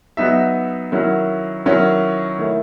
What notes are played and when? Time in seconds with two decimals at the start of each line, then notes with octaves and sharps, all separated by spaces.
0.17 F#3 B3 D#4 E5
0.92 D#3 F#3 C#4 E4
1.66 D#3 F#3 C#4 E4
2.39 D#3 A3 E4